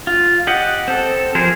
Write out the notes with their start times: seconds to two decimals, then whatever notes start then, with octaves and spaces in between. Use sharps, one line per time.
0.07 F4
0.47 G4 D#5 F#5
0.88 C4 A4
1.35 F3 G4 G#4 A#4 C5